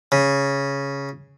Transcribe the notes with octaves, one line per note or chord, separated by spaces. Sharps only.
C#3